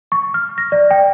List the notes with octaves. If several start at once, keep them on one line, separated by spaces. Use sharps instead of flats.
C#6
F6
A#6
D5
G5